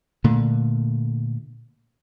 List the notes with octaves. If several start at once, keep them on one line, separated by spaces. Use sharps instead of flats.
A#2 D3 A3